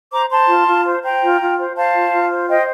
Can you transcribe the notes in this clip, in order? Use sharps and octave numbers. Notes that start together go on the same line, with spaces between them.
C5 A#5 D6
C5 A5 C6
F4
F4
C5
C5 G5 A#5
F4
F4
C5
C5 F5 A5
F4
F4
C5
C5 D#5 G5